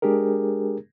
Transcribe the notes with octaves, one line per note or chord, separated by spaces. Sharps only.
G#3 D4 G4 G#4 A#4